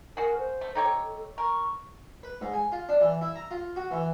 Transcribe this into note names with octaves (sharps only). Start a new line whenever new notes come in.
F#4 G#4 A#4
C5
A3
D#4 G4 A4 C#5
A#4 C#6
B4
G#2
G#5
F4
D4
E3
E4
A#5
F4
F#4
E3